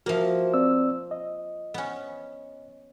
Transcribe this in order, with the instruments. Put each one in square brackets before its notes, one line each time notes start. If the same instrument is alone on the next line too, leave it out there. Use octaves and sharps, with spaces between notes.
[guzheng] F3 A#3 [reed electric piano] F#4 A#4 E5
[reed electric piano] C4 D5 E6
D#5
[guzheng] B3 C#4